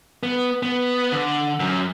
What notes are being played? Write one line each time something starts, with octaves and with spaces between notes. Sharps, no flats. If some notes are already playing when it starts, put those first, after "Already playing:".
B3
B3
D3
F#2